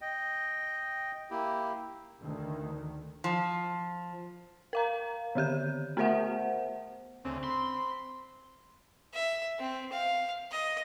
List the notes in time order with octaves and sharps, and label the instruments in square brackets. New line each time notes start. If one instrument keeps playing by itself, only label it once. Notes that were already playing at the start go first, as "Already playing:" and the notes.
[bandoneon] D#5 G5
A#3 E4 G4
[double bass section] D2 D#3
[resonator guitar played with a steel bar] F3
[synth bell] A#4 F5 A#5
D3 D#3 G4 G6
A3 B3 A#4 C5 E5 F#5
[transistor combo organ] D2 C#3 [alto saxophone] C4
[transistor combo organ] B5 [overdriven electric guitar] C6
[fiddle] E5
C4
F5
D#5